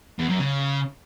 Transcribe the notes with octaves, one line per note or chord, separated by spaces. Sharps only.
E2
F#2
C#3